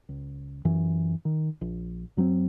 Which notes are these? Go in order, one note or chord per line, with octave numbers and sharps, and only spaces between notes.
C#2
F#2 E3
D#3
A#1
F#2 F#3 A3 C4